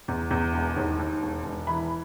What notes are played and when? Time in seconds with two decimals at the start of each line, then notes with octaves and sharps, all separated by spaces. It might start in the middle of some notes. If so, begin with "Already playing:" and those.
0.08 E2
0.31 E2
0.54 E1
0.76 D#2
0.99 D#2
1.22 E1
1.44 E1
1.67 E3 B5